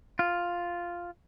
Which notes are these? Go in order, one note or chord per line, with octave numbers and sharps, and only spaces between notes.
F4